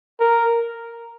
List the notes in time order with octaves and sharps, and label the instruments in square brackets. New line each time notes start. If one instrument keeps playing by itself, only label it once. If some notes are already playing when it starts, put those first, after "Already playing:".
[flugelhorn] A#4